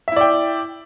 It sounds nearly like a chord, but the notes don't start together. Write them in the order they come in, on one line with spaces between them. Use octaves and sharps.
E5 E4 D5 G5